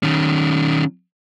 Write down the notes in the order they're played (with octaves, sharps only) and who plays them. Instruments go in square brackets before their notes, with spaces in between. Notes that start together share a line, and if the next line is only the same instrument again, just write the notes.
[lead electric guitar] D#3 C#4